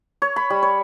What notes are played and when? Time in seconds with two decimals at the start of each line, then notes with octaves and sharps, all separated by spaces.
0.22 C#5
0.36 B5
0.50 G3
0.62 C#5